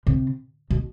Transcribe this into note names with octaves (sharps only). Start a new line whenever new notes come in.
C3
B2